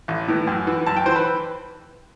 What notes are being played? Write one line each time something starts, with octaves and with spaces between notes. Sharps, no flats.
A1
A2 E3
F#2
E3
F#2 A5
G5
E3 C5
B4